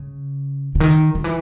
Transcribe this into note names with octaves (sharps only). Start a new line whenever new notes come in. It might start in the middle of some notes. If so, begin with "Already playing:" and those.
Already playing: C#3
C#3
D#3
D#3
E3